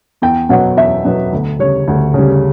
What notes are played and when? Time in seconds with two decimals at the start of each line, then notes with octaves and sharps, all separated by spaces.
0.22 E2 G5
0.49 B2 F#3 B3 F#5
0.77 E2 E5
1.04 B2 F#3 B3
1.33 D2
1.59 C#3 G3 C#5
1.88 D2
2.14 C#3 G3